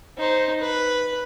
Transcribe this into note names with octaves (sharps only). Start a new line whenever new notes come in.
D#4 C5
B4